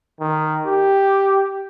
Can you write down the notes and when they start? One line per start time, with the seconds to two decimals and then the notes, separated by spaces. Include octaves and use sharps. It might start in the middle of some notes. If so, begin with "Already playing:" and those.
0.20 D#3
0.66 G4